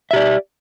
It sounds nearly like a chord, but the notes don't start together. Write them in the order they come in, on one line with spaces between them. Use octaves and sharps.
E5 G4 D5